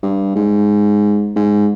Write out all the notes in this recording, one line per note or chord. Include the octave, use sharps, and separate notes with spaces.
G2
G#2
G#2